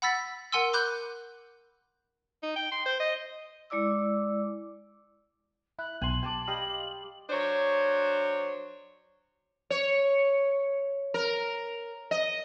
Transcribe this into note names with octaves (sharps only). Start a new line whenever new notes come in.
F#5 B5 E6 A6 B6
A#4 F#5 G#5 C6 E6
B5 D6 F#6 G6
D#4
G5
C6
C5
D#5
G#3 E4 D5 D6 E6
E4 F#6
B1 G#5 C6 F#7
G4 G#5 A5 D6
G3 G4 D#5 F5
F#3 D4 C5 C#5
C#5
A#4
D#5